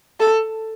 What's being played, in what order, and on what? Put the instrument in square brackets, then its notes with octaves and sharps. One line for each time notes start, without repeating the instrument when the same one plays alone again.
[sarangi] A4